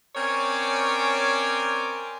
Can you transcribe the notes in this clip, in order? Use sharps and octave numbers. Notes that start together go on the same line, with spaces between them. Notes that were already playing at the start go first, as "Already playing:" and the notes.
C4 C#4 A#4 C#5 D5 G#5